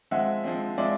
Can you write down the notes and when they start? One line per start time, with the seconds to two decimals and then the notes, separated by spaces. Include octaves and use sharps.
0.11 F3 G#3 C4 E5 F#5
0.44 F3 G#3 C4
0.78 F3 G#3 C4 D5 E5